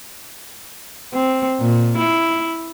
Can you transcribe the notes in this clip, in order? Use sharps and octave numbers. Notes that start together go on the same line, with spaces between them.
C4
A#2
E4